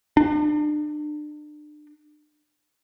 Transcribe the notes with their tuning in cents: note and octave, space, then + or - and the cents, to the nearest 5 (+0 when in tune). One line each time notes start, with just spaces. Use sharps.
D4 +35